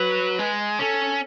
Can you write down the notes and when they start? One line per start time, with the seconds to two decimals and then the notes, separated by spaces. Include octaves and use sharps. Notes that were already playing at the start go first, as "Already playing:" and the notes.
Already playing: F#3 B4
0.39 G#3
0.79 C#4 A4